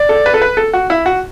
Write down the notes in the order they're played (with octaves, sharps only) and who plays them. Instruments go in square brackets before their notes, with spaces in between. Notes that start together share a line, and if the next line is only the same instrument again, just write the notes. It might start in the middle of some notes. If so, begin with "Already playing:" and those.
Already playing: [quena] D5
[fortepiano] A4
B4
A4
B4
A4
F#4
E4
F#4